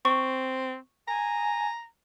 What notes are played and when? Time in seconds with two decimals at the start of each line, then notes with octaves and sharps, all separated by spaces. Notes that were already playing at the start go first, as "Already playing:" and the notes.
0.05 C4 C#6
1.08 G#5 A#5